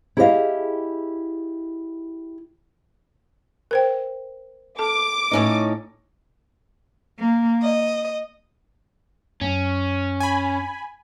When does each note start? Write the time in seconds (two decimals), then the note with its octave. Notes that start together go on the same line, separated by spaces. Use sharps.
0.17 E4 G4 G#4 C5 D#5 F5
3.71 A#4 C5 G5
4.79 A4 A5 D6
5.31 A2 C#4 D#4
7.18 A#3
7.62 D#5
9.41 F#2 C#4
10.20 G#5 B5